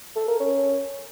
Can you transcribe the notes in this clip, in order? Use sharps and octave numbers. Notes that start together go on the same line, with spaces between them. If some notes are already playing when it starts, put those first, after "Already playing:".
A4
A#4
C#4